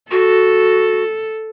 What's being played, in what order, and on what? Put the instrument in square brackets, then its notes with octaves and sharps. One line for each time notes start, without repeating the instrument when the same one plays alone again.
[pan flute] F#4 [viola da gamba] A4